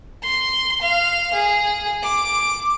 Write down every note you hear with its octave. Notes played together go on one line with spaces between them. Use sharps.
C6
F5
G#4
D6